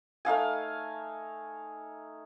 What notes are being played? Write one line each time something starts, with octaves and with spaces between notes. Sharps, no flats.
A3 D#4 F5 G#5